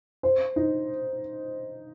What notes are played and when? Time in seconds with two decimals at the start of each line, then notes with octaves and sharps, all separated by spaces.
0.23 C5
0.56 D#4